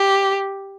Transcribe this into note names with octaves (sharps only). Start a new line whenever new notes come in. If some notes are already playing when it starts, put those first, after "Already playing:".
Already playing: G4